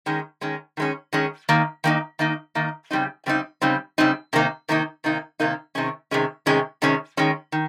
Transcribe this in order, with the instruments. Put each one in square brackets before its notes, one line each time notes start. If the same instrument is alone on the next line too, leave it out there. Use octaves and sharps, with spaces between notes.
[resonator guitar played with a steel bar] D#3 G#3 C#4
D#3 G#3 C#4
D#3 G#3 C#4
D#3 G#3 C#4
D#3 A#3 D#4
D#3 A#3 D#4
D#3 A#3 D#4
D#3 A#3 D#4
C#3 G3 C4 D#4
C#3 G3 C4 D#4
C#3 G3 C4 D#4
C#3 G3 C4 D#4
C3 D#3 A#3 D#4
C3 D#3 A#3 D#4
C3 D#3 A#3 D#4
C3 D#3 A#3 D#4
C3 D#3 G#3 C#4
C3 D#3 G#3 C#4
C3 D#3 G#3 C#4
C3 D#3 G#3 C#4
D#3 G#3 C#4
D#3